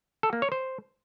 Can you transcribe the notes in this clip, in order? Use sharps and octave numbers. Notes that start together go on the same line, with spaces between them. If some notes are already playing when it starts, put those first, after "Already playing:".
A4
A#3
C#5
C5